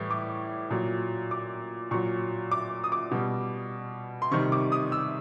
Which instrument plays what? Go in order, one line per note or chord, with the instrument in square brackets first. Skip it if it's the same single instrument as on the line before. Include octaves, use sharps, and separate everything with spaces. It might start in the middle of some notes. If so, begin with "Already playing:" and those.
Already playing: [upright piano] A2 E3 G3 C#6
D6
A#2 F#3
D6
A#2 F#3 C#6
D6
D#6
D6
B2 G3
C6
C3 D#3 G3 C#6
D6
D#6
E6